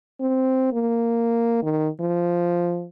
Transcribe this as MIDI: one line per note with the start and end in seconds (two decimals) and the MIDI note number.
0.21 0.72 60
0.73 1.58 58
1.63 1.88 51
2.00 2.86 53